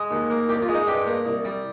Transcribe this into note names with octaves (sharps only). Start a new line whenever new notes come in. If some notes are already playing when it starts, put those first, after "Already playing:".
Already playing: G#3
D#2
A#3
C2 G4
F4
G#3
D#4
G2 G4
A#3
C2
G3